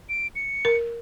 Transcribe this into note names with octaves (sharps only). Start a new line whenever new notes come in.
D7
C#7
A#4